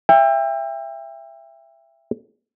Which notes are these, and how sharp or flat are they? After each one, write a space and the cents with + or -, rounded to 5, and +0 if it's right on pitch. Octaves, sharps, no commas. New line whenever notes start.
E5 +20 G5 +30